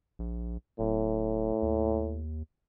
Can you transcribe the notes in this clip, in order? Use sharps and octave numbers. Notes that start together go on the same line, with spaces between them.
A#1
D1 A2
D#2